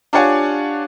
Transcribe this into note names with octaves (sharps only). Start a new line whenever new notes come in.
D4 F4 G4 C#5 F#5 G#5